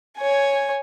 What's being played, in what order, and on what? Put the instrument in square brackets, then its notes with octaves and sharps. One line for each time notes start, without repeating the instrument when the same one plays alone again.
[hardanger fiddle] C#5 G#5